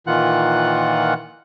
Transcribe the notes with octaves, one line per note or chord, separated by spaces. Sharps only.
A#2 D#3 E3 F4 F#5 F#6